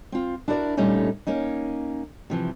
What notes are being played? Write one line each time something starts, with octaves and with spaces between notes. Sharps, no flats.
C4 F4
D4 E4 F#4 A#4 D5
A#2 G3 A3 C#4 D#4
A#3 C#4 D#4
C3 E3 F3